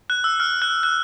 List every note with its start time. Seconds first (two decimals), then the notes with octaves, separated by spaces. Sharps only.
0.10 F#6
0.24 E6
0.40 F6
0.62 F#6
0.83 F#6